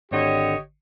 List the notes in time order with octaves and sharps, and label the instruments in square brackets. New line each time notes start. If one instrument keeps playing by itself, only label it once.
[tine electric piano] G#1 D3 [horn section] G4 C#5 D#5